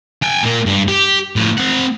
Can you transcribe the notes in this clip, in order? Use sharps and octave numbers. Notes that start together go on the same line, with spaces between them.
G5 G#5
A#2 A#3
G2
G4
A2 F3
C4 F#5